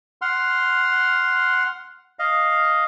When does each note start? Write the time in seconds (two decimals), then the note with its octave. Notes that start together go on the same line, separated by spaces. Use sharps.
0.22 F#5 C6 F6
2.19 D#5 F5